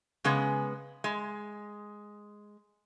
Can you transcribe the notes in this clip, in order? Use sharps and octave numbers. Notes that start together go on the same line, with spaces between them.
C#3 G#3 B3
G#3